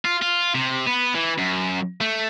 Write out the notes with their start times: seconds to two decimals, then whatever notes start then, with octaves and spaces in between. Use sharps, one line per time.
0.05 F4
0.22 F4
0.55 C3
0.87 B3
1.14 E3
1.38 F#2
2.01 A3